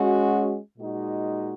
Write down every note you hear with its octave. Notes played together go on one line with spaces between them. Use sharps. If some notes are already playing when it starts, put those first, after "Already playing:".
Already playing: G#3 C#4 F#4
A#2 G#3 D#4 F#4